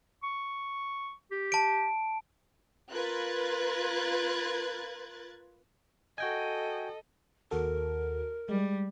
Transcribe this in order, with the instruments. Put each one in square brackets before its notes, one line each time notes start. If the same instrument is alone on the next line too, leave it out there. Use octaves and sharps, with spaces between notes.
[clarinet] C#6
G4
[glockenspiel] A5 D7
[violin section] F4 A#4 B4 F#6 G#6 A6
[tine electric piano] F#4 G5 G#5 [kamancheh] A4 D#5
[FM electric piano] D#2 F#4 A4 [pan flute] A#4
[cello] G3 [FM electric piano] G#3